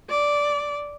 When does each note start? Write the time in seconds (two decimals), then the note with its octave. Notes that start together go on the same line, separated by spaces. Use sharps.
0.09 D5